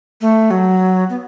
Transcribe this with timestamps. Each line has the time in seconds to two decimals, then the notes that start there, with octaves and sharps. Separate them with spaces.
0.21 A3
0.50 F#3
1.10 B3